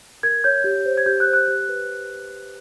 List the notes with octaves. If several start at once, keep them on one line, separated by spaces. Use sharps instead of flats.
A#4 G#6
C#5 G6
G4
C5
G#6
G4 G6
F#6
C5
F#6
G4
B4